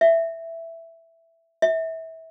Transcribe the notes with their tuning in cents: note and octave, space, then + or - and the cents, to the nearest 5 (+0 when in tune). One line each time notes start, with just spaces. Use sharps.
E5 +5
E5 -25